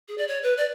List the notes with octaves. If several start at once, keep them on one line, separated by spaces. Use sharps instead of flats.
G#4
D5
C#5
B4
D5